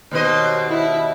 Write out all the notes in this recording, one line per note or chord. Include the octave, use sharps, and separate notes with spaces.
D#2 B2 C5 D#5
E4